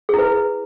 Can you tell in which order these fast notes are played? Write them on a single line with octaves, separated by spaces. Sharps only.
G#4 E4 B4